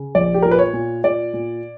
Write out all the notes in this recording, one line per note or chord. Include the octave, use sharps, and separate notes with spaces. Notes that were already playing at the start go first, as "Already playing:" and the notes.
Already playing: C#3
A#1 D5
G4
A#2 A#4
B4
C#5
A#2
A#2 D5
A#2